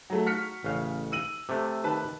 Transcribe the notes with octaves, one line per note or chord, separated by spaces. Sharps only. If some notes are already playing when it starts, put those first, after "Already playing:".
F#3 A3
F#4 F6 B6 C#7
A1 C#3 F5
E6 D#7 F#7
C3 A3
D#3 B4 A5